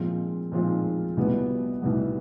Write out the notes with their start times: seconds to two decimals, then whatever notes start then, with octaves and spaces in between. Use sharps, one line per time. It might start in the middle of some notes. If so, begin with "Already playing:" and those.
Already playing: A#2 F3 G#3 C4 F4
0.52 A#2 F3 G#3 C4 F4
1.17 C2 B2 G3 B3
1.82 C2 B2 G3 B3